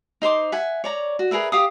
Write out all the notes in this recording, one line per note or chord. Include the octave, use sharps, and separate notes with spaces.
D#4 C5 C6 D6
E5 F#5 G#5
C#5 D5 A#5
F#4
G#4 A#4 B4 E5
G4 F5 D#6